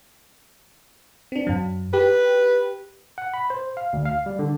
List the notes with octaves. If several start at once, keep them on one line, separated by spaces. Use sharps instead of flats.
C4 D4
F#2 F#3
G4 B4
F#5
B5
C5
F5
D2
F5
G3
D3